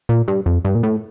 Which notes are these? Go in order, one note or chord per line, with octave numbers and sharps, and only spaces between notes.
A#2
G2
F2
G2
A#2
A2